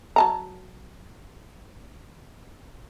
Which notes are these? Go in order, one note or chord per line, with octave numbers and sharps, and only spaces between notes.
F#3 A5 A#5